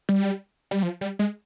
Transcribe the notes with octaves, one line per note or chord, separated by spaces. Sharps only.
G3
G3
F3
G3
G#3